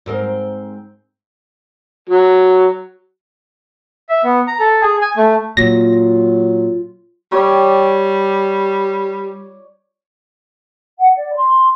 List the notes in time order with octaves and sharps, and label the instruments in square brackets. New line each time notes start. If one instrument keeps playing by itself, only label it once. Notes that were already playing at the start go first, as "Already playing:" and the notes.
[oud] G#2 C4 A#4
[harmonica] F#3
[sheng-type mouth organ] E5
B3
A#5
A4
G#4
G#5
A3
[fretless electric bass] A#2 [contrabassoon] F#3 [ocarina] F4 [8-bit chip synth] A#6
[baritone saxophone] G3 [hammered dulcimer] C#5 D5 G5
[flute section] F#5
D5
C6